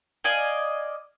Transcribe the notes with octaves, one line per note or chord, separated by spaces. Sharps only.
D5 D#5 F5 G#5